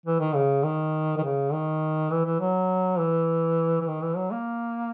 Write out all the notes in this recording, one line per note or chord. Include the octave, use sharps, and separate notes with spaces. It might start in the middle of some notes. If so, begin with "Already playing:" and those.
E3
D#3
C#3
D#3
D#3
C#3
D#3
E3
E3
F#3
E3
E3
D#3
E3
F#3
A#3